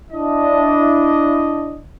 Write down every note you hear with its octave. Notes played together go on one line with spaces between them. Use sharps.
D4 E4 D#5